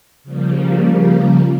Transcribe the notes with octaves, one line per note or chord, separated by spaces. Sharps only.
C#3 F3 G3 A#3